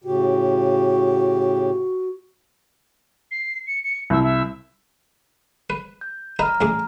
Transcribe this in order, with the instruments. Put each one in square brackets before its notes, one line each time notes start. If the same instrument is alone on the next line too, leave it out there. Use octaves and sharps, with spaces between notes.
[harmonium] A2 C#3 G4 [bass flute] F#4
[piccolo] C7
C#7
C#7
[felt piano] C2 [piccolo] E5
[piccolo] E5
[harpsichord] B4
[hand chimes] G6
[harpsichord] D#4 B4 [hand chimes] A#5 F6
[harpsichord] A1 G#4 D6